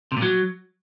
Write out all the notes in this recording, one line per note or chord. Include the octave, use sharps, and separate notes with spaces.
C3
A#2
F#3